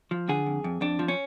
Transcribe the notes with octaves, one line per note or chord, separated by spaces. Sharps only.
F3
D3 G#4
F2
F2
F2 D4
F3
C#4